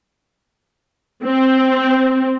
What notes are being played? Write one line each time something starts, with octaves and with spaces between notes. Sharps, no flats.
C4